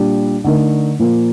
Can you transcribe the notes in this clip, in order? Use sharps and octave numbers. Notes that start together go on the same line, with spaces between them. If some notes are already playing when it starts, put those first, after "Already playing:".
Already playing: A#2 G3 D4 G4
D3 A3 D#4 A#4
A#2 F3 A#3